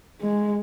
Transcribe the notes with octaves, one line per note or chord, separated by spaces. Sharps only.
G#3